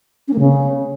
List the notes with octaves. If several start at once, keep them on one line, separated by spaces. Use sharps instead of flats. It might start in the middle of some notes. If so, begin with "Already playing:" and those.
C#4
A#3
C#3